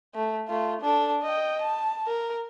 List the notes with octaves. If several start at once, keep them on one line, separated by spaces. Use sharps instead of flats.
A3
A3 F4
D4 A4
D#5 G5
A5
A#4